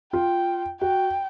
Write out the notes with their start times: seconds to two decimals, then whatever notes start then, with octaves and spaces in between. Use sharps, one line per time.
0.13 F4 G5
0.81 F#4 G5